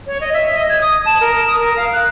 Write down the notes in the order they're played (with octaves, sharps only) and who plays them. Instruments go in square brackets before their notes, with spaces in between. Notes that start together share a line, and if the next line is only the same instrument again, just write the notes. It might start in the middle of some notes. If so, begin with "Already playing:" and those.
[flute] C#5
D#5
E5
D#5
G#6
D#6
A5
A#4
D#6
A#4
F5
F#6